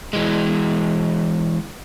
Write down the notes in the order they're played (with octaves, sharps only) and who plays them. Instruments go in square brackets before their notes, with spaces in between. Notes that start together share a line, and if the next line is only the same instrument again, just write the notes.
[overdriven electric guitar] E3 G#3